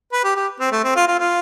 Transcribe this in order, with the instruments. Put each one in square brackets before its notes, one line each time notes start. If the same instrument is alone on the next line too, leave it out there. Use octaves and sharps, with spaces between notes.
[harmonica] B4
G4
G4
C4
A3
C4
F4
F4
F4